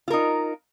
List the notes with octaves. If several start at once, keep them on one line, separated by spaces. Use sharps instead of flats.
D#4 F4 A#4